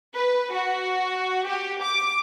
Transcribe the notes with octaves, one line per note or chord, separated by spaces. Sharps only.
B4
F#4
G4
D6